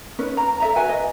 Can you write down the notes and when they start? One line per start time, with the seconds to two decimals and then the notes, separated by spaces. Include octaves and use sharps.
0.19 C#4 D#4 B4
0.37 A#5
0.60 A4 E5 A#5
0.76 F#4 B4 E5 G#5
0.89 D#5